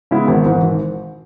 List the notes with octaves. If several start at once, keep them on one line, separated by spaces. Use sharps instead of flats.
C#3 G#3 B3 E4
G#1
G#2 E3
G#1